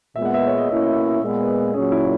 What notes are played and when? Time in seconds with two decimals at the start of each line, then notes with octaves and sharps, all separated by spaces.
0.16 A#2 G#3 B3 E5
0.25 F#5
0.34 E5
0.47 C#5
0.58 D#5
0.69 B2 A#3 C#4 E4 E5
1.22 A#2 G#3 B3
1.74 A#2 F#3 C#4 G#4
1.92 E4